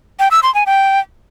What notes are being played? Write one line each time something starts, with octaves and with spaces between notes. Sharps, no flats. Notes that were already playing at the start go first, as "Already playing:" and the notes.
G5
E6
C6
G#5
G5